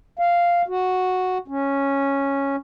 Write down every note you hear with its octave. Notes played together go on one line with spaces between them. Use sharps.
F5
F#4
C#4